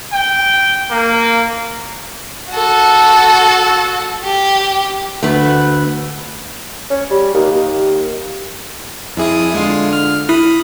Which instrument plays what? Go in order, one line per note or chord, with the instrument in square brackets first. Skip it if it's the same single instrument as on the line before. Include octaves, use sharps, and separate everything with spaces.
[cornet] G5
A#3
[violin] F#4 A4
G4
[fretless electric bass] D2 [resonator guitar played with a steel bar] A3 B3
[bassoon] C#4
G3
D#2
D#2
[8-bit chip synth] F2 G#4 D#6 [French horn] E4
[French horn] D3 [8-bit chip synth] G#3 F4
[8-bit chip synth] F6
[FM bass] E4 [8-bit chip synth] B5 D#6